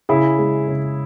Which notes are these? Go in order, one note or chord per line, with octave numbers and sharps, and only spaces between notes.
C#3 E4 G#4
G#3
C#3